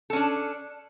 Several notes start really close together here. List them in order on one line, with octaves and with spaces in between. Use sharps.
A4 C#4 D4